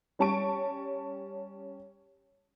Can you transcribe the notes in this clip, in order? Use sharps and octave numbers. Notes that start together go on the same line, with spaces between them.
G3 C#4 A5 C#6 D7